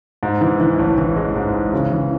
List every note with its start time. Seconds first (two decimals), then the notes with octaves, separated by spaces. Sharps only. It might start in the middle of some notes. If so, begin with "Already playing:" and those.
0.23 G#2
0.41 E3
0.60 E3
0.79 A1
0.98 E3
1.16 G#3
1.35 G#2
1.54 G#3
1.73 C#3
1.92 E3